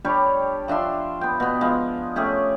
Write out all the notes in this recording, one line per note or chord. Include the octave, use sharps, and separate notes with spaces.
G3 D4 G4 C#5
F3 D4 E5 C6
B3 G5
B2 B3
F3 G#3
A3 C#4 G4 G#4